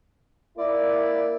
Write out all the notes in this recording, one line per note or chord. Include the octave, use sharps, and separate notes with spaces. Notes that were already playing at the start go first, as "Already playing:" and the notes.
A#3 E4 D5